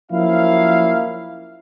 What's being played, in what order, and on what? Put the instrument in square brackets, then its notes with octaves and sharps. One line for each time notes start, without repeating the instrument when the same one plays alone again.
[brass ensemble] F3 F#3 A#3 C#4 E4 F5